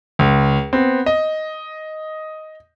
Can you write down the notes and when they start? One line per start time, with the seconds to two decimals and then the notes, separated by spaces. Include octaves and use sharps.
0.19 C#2
0.73 B3 C4
1.06 D#5